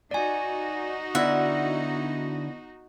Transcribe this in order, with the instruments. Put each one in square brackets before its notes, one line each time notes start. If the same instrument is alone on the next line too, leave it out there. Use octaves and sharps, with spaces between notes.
[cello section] D#4 F#4 D#5 [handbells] D5 G#5
[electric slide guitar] D3 E4 D5 [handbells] B3 [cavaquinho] E5 F#5